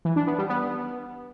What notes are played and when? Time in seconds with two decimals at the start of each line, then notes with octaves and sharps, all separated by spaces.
0.05 E3
0.16 D4
0.27 B3
0.38 G3
0.49 B3